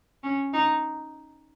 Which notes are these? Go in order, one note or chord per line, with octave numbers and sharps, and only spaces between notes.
C#4
D#4